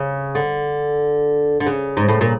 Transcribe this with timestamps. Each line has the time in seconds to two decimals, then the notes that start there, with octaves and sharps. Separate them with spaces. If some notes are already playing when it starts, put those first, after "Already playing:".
Already playing: C#3
0.35 D3
1.60 D3
1.66 C#3
1.97 G#2
2.08 A2
2.21 A#2